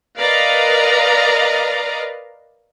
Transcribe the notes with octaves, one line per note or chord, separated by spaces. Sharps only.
A#4 B4 D5 D#5 F5 A#5